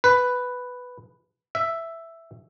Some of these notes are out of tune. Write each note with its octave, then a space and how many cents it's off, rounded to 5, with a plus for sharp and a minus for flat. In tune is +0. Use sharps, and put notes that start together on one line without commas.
B4 +5
E5 +5